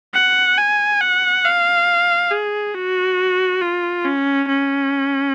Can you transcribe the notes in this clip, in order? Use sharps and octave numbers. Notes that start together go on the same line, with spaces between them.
F#5
G#5
F#5
F5
G#4
F#4
F4
C#4
C#4